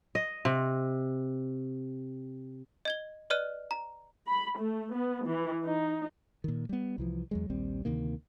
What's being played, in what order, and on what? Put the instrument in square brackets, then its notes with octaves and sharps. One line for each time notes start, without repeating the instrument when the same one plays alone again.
[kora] D#5
C3
[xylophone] D#5 G#6 G7
B4 D5 D#5 F6 F#6 D#7
A#5
[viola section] B5
A3
B3
E3
D#4
[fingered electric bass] A#2 D#3
G3 B3
C2 E3 F3
E2 F#3 G#3
A#1 D#2 G3 C4
D2 C3 D#3 A#3